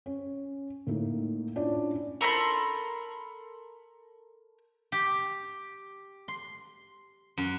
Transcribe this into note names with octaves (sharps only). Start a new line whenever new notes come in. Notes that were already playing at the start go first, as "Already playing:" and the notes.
C#4
A2 A#3 D#4
C#4 D4 E4 F4 D5
A4 A#4 B5 C6
G4
C6
F#2